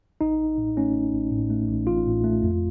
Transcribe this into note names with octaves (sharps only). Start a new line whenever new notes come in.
A1 D#4
A1
A2
A3 C#4
A1
A1
A2
A3
A1
A1 F4
A2
A3
F2